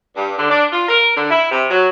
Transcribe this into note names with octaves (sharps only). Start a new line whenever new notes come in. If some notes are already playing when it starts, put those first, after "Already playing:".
G2
D3
D4
F4
A#4
D3
E4
C3
F#3